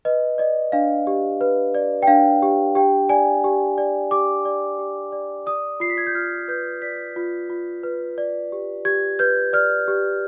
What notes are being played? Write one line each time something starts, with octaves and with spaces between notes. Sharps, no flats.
B4 D#5
D5 D#5
D4 F5
G4
B4
D5
G5
D4 F5
G4
G4 G5
D5 G#5
G4
D5
G4 D6
D5
G4
D5
D5 D#6
F4 C7
B6
G#6
G6
F4 F6
B4 G6
D5 B6
F4
F4
B4
D5
G4
G4 G#6
B4 G6
D5 F6
G4